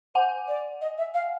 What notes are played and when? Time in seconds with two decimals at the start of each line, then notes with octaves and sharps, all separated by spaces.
0.15 C5 F#5 G#5
0.48 D5
0.81 D#5
0.98 E5
1.14 F5